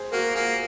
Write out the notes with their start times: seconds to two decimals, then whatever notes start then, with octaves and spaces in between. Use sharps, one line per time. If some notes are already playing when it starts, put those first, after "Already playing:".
Already playing: G#4 C5
0.12 A#3 F#4 A#4
0.35 A#3 F4 G#4